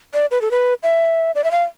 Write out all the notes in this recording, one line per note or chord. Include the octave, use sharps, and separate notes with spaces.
D5
B4
A4
B4
E5
D5
E5
F5